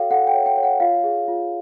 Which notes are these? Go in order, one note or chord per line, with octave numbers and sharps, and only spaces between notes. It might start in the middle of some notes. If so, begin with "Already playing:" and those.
Already playing: F#4 A4 C#5 F5 G5
A4 F#5
G5
C#5
G5
C#5
F#5
F4 F5
G#4
F4